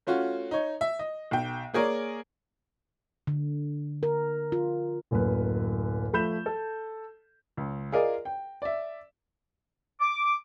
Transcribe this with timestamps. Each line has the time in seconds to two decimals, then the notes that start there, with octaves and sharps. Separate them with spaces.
0.07 A3 C#4 F4 F#4
0.51 D#4 C#5
0.81 E5
0.99 D#5
1.31 B1 G5
1.74 A#3 G#4 A#4 C#5 D5
3.27 D3
4.03 A#4
4.52 F4
5.11 D1 F#2 A#3 B4
6.13 F3 A3 B5 G6 E7
6.46 A4
7.57 C#2
7.92 F4 G#4 A#4 D5 D#5
8.25 G5
8.62 D5 E5
10.01 D6